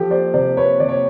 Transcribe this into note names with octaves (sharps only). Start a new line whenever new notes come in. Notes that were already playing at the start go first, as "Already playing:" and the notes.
Already playing: F3 G4 A4
C5 D5
C3 C5 D5
B4 C#5
C3 D5
C#5